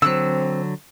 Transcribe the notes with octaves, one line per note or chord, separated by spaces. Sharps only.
D3 F#3 C4 E6 F#6